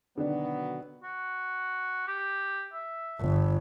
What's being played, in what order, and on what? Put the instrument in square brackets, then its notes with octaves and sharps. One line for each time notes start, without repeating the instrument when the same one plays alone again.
[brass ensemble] B2 F#3 B3 [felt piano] D3 D#3 D4
[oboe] F#4
G4
E5
[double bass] G1